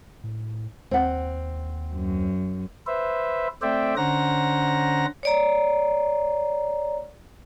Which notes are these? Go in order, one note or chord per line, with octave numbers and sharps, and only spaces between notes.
A2
D#2 C4 F#5
F#2
B4 C5 E5
A3 C4 C5 D5 E5 G5
D3 C#4 C5 F#5 A#5 A#6
C#5 D5 A#5